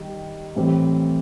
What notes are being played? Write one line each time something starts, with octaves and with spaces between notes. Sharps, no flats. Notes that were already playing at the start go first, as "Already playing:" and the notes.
Already playing: D#3 G3
A2 E3 G3 C4